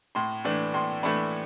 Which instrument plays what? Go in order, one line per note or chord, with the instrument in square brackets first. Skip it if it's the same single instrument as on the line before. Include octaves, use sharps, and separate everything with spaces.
[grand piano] A2 C6
E3 A3 D4
A2 C6
E3 A3 D4 B5